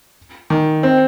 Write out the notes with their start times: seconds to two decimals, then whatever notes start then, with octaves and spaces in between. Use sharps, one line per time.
0.50 D#3
0.83 C4